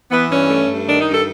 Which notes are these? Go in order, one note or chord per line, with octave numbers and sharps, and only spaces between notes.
E3 B3
G2 C#4
A3
G2
D#3 D4
D#4
G2
A4